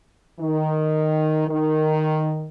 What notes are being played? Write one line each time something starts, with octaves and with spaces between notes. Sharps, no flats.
D#3
D#3